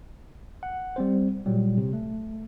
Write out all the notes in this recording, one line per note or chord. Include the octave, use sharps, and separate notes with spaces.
F#5
G3 C4 C5
A#2 F#3 G3
C3
A3